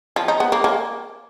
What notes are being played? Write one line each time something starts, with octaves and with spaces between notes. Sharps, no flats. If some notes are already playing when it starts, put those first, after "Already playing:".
F3
D#4
B3
A#3
A#3